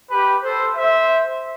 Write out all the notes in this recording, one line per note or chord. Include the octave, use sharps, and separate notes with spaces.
G4 B4
A4 C5
C5 E5